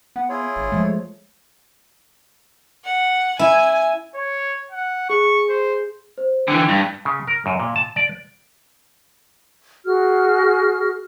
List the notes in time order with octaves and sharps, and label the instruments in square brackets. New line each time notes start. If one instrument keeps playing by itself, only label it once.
[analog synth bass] B3 [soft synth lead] F#5
[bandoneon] E4 F4 G#4 [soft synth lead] C#5
[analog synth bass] G#1
[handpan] F3 G#3 [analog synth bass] A3
[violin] F#5
[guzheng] E4 [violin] G#5
[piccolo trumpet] C#5
F#5
[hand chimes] G#4 [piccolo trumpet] C#6
[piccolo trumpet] C5
[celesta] C5
[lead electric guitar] D3 E3 [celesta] G5
[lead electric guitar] G2
[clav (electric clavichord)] C#3
A#4
F#2
A#2
A5
D5
[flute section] F#4 G#4 F6